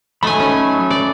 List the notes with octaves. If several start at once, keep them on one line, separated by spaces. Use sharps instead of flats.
F#3 A3 D#4 G#5 B5
C#4
D5